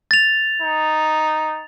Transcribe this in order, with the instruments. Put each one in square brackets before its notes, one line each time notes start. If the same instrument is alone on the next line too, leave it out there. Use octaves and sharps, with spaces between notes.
[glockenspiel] A6 F7
[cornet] D#4